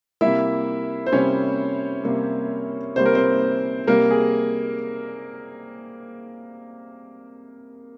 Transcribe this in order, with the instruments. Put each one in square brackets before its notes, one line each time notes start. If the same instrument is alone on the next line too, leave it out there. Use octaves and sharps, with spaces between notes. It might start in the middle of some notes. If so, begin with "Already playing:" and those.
[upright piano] C3 G3 A#3 E4 E5
C5
C3 G3 A#3 C#4 C#5
C3 G3 A#3
C3 G3 A#3 C5
A#4
C4 C5
C3 G3 A#3 A#4
G#4